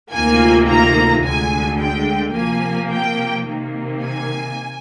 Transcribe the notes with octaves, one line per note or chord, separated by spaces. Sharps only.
D2 C3 D#3 A#3 F4 G#5
A#5
D2 D3 G#3 G#5
G5
C3 F3 A#3 G#5
G5
C3 D#3 A#3
G#5